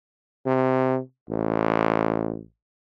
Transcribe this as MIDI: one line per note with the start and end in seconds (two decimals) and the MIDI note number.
0.46 0.99 48
1.30 2.41 33